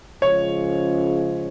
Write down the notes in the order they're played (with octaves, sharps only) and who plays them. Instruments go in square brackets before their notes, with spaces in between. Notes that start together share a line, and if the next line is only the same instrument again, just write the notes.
[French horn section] C#3 F3 G#3 C#4 F4 [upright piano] C#5